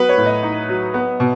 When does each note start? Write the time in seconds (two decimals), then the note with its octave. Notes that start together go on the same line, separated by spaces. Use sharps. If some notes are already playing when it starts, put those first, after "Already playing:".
Already playing: F#3 B3 B4
0.09 C#5
0.18 A2
0.26 D#5
0.43 D#4
0.69 F#3
0.94 B3
1.20 B2